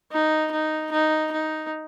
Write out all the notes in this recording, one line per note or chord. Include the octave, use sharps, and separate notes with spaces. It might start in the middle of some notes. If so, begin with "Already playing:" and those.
D#4
D#4
D#4
D#4